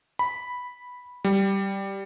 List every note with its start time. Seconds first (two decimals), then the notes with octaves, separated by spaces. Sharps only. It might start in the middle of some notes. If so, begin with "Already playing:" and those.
0.19 B5
1.24 G3